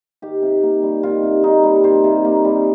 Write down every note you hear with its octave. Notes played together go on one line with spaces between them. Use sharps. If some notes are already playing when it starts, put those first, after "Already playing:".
D#3 G4
C3
A#3
G3
D#3 F4
C3
A#3 D#4
G3
D#3 C5
C3
A#3
G3